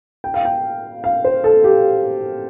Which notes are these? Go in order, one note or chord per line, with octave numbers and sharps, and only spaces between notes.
G5
F5
G5
F5
C5
A4
G4